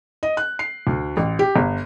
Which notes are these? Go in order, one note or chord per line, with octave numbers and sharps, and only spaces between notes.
D#5
F#6
C7
D2
A1
G4
G1